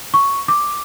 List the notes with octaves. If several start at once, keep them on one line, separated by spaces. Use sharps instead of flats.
C#6
D6